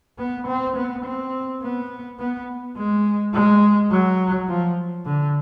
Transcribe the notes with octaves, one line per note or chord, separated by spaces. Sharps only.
B3
C4
B3
C4
B3
B3
G#3
G#3
F#3
F3
D3